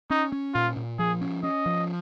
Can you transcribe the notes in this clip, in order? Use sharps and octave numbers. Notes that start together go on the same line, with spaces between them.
C#4 D#4
C#4
A#2 F4
A#2
F3 G#4
C#4
C#4 D#5
F3